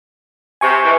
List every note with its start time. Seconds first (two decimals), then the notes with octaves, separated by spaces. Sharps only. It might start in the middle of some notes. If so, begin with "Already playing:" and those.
0.61 C3 G#5 C#6
0.84 B2 D#3 E3